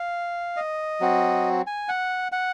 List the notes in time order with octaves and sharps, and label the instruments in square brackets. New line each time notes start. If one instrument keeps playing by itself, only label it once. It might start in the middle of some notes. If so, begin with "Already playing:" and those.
Already playing: [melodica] F5
D#5
F#3 C4 F#4
G#5
F#5
F#5